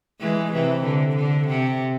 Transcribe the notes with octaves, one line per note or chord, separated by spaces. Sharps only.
E3 G#3
C3 E3
D3
D3
C3